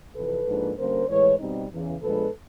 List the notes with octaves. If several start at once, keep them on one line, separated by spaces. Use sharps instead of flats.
F2 C3 E3 A4 B4
G#2 F3 A#3 D4
D3 G3 A#3 C#4 A#4 C5
A2 E3 G#3 B4 C#5
B2 G3 C4 D#4
E2 C#3 E3
A#2 F3 G#3 B3 D4 A4 B4